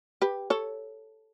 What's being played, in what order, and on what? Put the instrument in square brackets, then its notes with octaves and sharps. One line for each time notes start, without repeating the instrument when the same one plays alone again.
[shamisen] G4 B4
A4 C#5